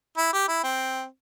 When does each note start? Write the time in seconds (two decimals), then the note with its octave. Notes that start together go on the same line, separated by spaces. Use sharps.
0.18 E4
0.33 G4
0.48 E4
0.64 C4